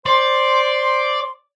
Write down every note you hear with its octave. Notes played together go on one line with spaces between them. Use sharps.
C5 D5 C6